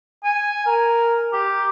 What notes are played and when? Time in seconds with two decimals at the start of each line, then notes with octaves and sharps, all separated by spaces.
0.24 G#5
0.66 A#4
1.33 G4